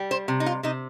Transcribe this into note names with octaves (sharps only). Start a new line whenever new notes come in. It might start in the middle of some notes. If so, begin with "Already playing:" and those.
Already playing: G3
C5
C3
D#4
F4
C3 D#4